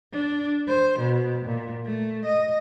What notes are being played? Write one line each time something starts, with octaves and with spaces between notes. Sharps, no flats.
D4
C5
B2
A#2
A3
D#5